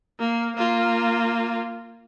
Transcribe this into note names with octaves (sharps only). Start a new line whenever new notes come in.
A#3
A#3 F4